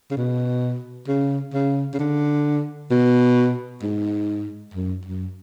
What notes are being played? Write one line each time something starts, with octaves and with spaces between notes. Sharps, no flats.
C#3
B2
C#3
C#3
C#3
D3
B2
G#2
F#2
F#2